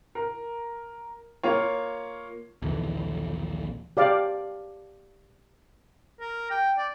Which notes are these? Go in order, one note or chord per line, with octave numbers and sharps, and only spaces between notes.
A#4
A#3 F4 C#5
A#1 D#2 D3 E3
G4 D5 F5
A#4
G5
D5